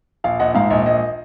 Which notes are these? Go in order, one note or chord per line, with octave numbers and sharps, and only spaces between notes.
A#1 F5
A#1 D#5 F#5
G#2 F5
A#1 D#5
A#1 D#5